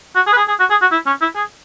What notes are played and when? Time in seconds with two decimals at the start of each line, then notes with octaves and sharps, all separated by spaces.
0.16 F#4
0.27 G#4
0.33 B4
0.37 G#4
0.48 G#4
0.59 F#4
0.70 G#4
0.81 F#4
0.92 E4
1.06 C#4
1.21 E4
1.35 G#4